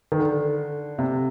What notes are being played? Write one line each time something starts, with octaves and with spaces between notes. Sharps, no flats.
D#3
D3
C3